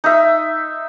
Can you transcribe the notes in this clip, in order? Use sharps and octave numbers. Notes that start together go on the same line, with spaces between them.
D#4 E5